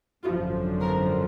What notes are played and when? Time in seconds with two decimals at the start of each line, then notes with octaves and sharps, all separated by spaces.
0.24 G#1 F#2 D3 F3 F4
0.80 A#4